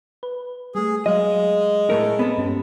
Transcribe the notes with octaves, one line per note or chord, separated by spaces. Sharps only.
B4
G3 A3 G#4
F#3 G#3 D#5 F5
A2 A3 A#4 E6
B3 C4 A4
G2 C#4 G4